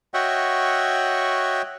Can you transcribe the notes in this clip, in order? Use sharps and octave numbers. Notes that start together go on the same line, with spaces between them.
F#4 C#5 D#5 E5 F#5 G5